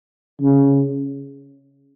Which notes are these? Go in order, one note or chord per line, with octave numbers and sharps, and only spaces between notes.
C#3